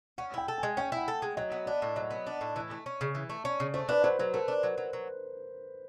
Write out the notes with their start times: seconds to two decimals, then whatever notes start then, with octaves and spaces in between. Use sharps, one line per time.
0.18 C#4 F#5
0.34 E4 G5
0.48 A4
0.58 G#5
0.63 G#3
0.77 C#4 G5
0.92 E4 F#5
1.08 A4
1.22 G#3
1.37 F#3 D#5
1.52 B3
1.66 D4 D5
1.82 A2
1.96 F#3 D#5
2.11 B3
2.27 D4
2.41 A2
2.56 E3
2.71 A3
2.86 C#4
3.01 C#3
3.15 E3
3.30 A3
3.44 C#4 D5
3.60 C#3
3.74 A3 C5
3.89 D4 B4
4.04 F#3 C5
4.19 F#3 B4
4.34 A3 A#4
4.48 D4
4.63 F#3
4.78 F#3
4.93 F#3